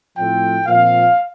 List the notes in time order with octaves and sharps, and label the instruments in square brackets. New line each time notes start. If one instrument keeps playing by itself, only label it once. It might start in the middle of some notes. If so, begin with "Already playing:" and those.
[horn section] A2 F3 A3 C4 G5
A#2 F3 C4 F5